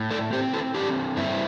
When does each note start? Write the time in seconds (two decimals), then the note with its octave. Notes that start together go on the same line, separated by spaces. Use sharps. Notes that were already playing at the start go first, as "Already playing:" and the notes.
Already playing: A2
0.11 A4 D5
0.33 C4 G4 C5
0.53 E4 A4
0.74 D3 D4 G4
1.16 G2 C4 E4